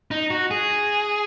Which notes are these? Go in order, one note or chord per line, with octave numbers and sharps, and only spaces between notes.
D#4
F#4
G#4